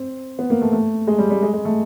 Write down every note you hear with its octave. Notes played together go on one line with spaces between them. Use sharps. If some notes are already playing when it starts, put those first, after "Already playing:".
Already playing: C4
B3
A#3
A3
A3
G#3
G3
G3
G#3
G#3
A3